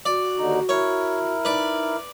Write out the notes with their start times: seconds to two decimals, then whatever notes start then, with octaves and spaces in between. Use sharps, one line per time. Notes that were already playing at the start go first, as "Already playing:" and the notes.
0.05 F#4 D5
0.38 D#2 D3 D#4
0.69 E4 A#4 C#5
1.45 D#4 B4 D5